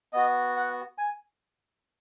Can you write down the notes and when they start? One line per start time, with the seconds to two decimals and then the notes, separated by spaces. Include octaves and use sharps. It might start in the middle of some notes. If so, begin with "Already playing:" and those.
0.13 B3 F#4 D#5
0.56 F#5
0.98 G#5